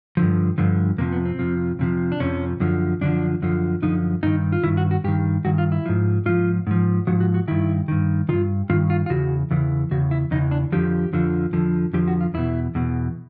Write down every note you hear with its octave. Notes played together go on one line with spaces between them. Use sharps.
G2 D3 F3
G2 D3 F3
F2 C3 F3 A#3
B3
C4
F2 C3 F3
F2 C3 F3
D4
F2 C3 F3 C#4
F#2 D3 F3
F#2 D3 F3 D4
F#2 D3 F3
F#2 D3 F3 D#4
G2 D#3 D#4
F4
G2 D#3 E4
F#4
F#4
G2 D#3 G4
G2 D#3 F#4
F4
E4
G#2 F3
G#2 F3 F4
G#2 F3
G#2 F3 F#4
F#4
F#4
G2 D#3 E4
G2 D#3
G2 D#3 F4
G2 D#3 F4
F4
F4
E2 C#3 F#4
E2 C#3 E3
E2 C#3 F#4
E4
E2 C#3 E3 D#4
D4
F2 D3 F3 G4
F2 D3 F3
F2 D3 F3
F2 D3 F3 G4
F#4
F4
E2 B2 E4
E2 B2